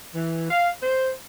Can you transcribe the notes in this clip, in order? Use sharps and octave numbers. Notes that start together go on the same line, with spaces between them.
E3
F5
C5